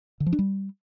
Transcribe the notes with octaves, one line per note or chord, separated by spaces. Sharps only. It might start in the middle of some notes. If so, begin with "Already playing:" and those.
D3
F3
D4
G3